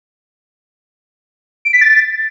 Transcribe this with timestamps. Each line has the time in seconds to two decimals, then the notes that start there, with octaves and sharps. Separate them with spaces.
1.65 D7
1.73 B6
1.81 A6